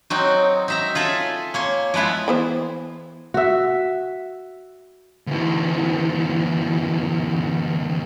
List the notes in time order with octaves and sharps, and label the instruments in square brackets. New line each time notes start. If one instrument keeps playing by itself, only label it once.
[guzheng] F#3 C4 D#4
D#4 E5 A#5
F4 G#4 A4 E5
A#3 C#5 C6
F3 G#3 B3 E4 F4
[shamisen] E3 B3 C5
[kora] F#4 E5
[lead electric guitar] D2 E3